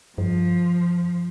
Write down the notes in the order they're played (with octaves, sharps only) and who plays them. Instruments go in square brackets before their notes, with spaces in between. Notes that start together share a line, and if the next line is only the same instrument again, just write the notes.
[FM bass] G2 [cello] F3